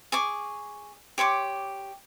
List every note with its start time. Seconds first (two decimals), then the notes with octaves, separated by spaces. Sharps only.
0.12 G#4 C#6 D6
1.18 G4 C#5 C6 D6